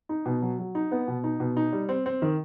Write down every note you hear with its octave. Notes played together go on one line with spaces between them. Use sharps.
D#4
B2
F#3
F#3
D#4
B3
B2
D#4
B2
D#4
G3
C4
C4
D#3